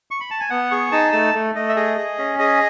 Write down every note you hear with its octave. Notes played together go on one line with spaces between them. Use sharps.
C#6
B5
A5
G#5
B3 F#5
G#4 C#6
D#4 A5
A3 A5
A3
A3 D#5
E5
G#4 D#5
G#4
C#4
G#4 D#5